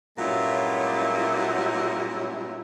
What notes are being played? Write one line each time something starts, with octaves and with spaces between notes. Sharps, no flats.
G2 A#2 F#3 G#3 C#4 E4